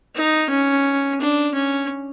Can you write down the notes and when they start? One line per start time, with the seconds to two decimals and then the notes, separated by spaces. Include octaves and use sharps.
0.16 D#4
0.50 C#4
1.21 D4
1.55 C#4